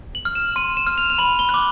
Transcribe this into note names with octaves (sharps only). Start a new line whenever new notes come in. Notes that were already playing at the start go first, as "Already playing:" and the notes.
F#7
F6
E7
C6 D#7
E7
F6
F7
F7
B5 F#7
G7
F#6
D6